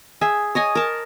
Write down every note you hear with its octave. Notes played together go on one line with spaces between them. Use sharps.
G#4 E5
C#5 D#5 G#5
A#4 A5